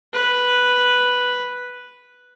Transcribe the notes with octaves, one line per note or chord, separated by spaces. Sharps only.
B4